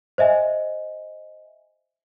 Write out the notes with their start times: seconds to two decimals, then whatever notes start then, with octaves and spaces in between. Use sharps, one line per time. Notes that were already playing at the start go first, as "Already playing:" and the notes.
0.18 C5 D#5 E5 G#5